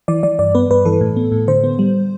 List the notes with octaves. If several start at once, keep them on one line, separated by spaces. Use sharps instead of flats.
E3 D5
E3 D5
G2 D5
B3 B4
G2 B4
E3 A4
A2
B3
A2
D3 C5
B3
G3